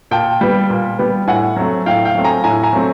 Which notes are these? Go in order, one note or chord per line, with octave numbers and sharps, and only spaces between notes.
A#2 G5 A5
G3 B3
A#2
G3 B3
A2 F#5 G#5
F#3 A3 C4
A2 F5 G5
F5 G5
F#3 A3 C4
G#5 A#5
A2 G#5 A#5
G#5 A#5
F#3 A3 C4